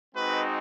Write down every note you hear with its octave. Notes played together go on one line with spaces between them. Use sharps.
G#3 C4 D#4 F#4 B4